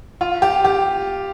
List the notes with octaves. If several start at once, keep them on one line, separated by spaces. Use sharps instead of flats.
F4
G4
G4